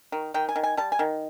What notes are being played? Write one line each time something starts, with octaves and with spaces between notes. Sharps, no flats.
D#3
D#3 G5
G#5
D#3
G#5
G3 A5
G#5
D#3